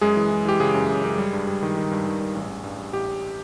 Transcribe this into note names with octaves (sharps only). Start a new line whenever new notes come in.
F#2 G#3 G#4
E3
E3
E3 G4
C#3 G#3 G#4
F#2
F#2
F#2
G3
G2
G3
D#3
D#3
G2
D#3
G2
A1
A1
G2
G2
A1 G4
A1